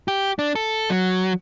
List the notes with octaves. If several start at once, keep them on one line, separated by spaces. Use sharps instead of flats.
G4
D4
A4
F#3